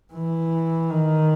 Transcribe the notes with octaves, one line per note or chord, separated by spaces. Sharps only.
E3
D#3